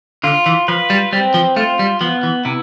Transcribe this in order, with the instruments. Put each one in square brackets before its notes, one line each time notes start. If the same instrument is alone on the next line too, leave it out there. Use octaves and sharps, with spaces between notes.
[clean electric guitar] D3 [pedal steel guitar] F4
[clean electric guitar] E3
[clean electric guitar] F3 [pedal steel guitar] B4
[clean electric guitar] G3
[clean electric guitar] G3 [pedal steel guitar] C4
[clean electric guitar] F3
[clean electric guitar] A3 [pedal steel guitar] F4
[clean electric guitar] G3
[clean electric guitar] F3 [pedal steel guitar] B3
[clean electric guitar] E3
[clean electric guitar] C3 [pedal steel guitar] E4